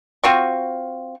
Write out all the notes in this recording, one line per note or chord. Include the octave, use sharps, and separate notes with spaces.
C4 F4 F#4 C#6